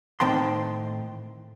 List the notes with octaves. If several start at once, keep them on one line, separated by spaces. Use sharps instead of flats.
A2 D#3 C4 G5 A5 C6